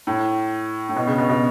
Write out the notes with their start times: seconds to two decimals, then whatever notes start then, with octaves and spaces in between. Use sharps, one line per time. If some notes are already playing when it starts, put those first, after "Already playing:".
0.07 A2
0.89 A2
0.96 B2
1.07 C#3
1.18 B2
1.29 B2